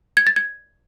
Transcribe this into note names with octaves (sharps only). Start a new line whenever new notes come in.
G#6
A6
G#6